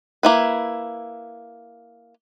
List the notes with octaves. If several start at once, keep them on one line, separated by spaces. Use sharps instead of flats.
A#3 E4 B4